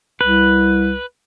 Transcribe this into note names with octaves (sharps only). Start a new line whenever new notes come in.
C2 B4